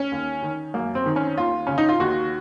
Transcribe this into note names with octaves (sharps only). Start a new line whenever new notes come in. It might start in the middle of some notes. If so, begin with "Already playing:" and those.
Already playing: C#4
D#2
D#3
F#2 A#3
C4
D#3
C#4
D#2 F4
C#3 C#4
D#4
F4
D#2 F#4